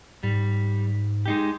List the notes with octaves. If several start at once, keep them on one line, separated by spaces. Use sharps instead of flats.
G#2 G3
G#3 D#4 G4